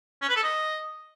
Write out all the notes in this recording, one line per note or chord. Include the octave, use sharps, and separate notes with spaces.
C#4
B4
A4
D#5